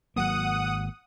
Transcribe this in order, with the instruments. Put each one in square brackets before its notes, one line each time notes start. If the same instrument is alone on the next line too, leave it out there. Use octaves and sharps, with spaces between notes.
[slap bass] G#1 F#3 A#3 [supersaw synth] F#5 D#6